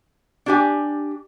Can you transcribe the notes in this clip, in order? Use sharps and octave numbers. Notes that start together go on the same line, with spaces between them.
D4 G4 G#5